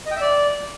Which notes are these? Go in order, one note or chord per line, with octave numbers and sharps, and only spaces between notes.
D#5
G5
E5
D5